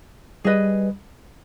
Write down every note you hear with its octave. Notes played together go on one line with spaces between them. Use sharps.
G3 G#4 B4 D#5